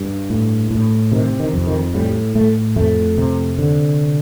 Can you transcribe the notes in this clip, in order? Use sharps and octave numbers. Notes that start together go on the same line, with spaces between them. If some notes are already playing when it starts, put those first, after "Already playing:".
Already playing: G2
A2
A2
C3 D#3
D#3
F2
D#3
A2 G3
A2 A3
F2 A3
C3
D3